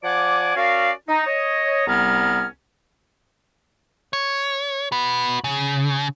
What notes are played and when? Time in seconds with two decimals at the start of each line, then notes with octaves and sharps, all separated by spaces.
0.04 F3 D5 F#5 G#5 D6
0.56 C#4 F#4 A#4 D5 F5
1.08 D#4
1.27 C#5 D#5
1.87 C2 G3 B3 C#4 A#5 F6
4.13 C#5
4.92 F#4 B4
5.44 C#3